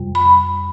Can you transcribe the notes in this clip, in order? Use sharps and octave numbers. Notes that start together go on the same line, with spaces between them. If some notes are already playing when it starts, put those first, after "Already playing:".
Already playing: F2 C3 G3
B5